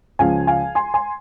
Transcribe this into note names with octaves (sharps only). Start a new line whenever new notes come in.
C#2 C#3 F3 F5 G#5
F5 G#5
G#5 C6
G#5 C6